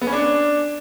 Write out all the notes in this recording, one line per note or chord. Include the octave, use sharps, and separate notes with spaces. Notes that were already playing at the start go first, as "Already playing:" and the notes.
B3
C#4
D4